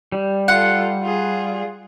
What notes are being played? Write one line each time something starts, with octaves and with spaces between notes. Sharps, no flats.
G3
F4 A4 F#5
F4 G#4